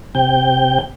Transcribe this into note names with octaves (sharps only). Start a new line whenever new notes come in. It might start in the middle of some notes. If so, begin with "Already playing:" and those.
C3 G5